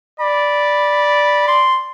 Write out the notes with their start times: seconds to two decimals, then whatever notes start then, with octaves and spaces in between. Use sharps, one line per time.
0.20 D5 B5
1.48 C6